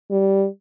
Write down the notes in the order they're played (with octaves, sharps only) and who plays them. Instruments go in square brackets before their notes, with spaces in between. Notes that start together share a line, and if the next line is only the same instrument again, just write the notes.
[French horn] G3